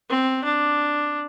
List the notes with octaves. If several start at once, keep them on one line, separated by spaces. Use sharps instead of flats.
C4
D4